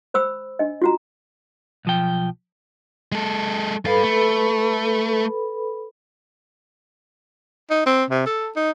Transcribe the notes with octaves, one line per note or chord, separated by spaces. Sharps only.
C5 B5 E6
D4 D#5
F4 F#4 A#5
B1 F3 G5
G#3 A4
G2 A4 B4 F5 B5
A3
D#4
C4
C3
A4
D#4